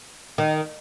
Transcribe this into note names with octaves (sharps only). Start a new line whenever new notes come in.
D#3